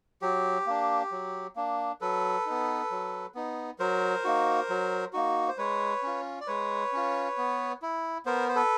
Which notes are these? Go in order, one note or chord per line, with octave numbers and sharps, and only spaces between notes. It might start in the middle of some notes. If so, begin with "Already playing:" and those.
F#3 G4
A#3 D4
F#3
A#3 D4
F#3 A4 B4
B3 D#4
F#3
B3 D#4
F#3 A#4 C5
A#3 D#4 F#4
F#3
A#3 D#4 F#4
C5
G#3 B4 C#5
C#4 F4
D5
G#3 B4 C#5
C#4 F4
B3
E4
B3 A#4 C5
C5
A4 B4